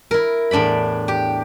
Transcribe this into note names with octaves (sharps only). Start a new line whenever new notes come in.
E4 A#4
E2 A2 D4 D5 B5
G4